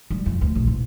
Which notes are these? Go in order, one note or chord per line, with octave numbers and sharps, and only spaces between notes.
G3
F2
D2
A#1
A1